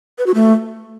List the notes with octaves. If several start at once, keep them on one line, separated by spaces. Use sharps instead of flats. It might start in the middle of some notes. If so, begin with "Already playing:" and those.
B4
F#4
A3